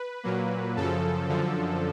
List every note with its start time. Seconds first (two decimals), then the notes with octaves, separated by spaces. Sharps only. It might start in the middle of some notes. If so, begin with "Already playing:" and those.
Already playing: B4
0.23 A#2 F#3 A#3
0.76 F#2 C#3 F3 A4
1.28 F#2 D3 F3